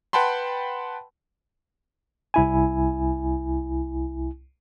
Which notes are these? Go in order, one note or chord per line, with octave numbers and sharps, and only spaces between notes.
B4 F#5 G5 A5 B5 C6
C2 E4 G#5